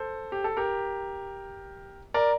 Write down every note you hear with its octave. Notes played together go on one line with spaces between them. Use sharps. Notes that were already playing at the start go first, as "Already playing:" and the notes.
Already playing: A4 C5
G4
A4
G4 A#4
A#4 D5